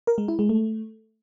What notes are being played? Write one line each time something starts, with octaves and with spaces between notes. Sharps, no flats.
A#4
G#3
E4
G#3
A3